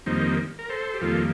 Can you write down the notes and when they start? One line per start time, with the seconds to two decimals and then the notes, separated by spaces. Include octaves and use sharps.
0.06 F2 D#3 G3 A#3 C4 D#4
0.59 A#4
0.70 A4 C5
0.94 G4
1.01 F2 D#3 G3 A#3 F4 A4